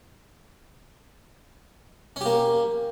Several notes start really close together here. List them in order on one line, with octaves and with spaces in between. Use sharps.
C#4 G4 A#3